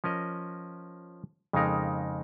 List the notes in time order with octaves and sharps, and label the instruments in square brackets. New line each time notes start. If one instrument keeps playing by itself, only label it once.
[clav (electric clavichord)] F3 C#4 A#4 D#5
F2 C#3 G#3 D#4 A#4